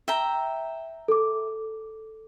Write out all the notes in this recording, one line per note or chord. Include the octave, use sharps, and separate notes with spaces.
E5 G5 A#5
A4 D6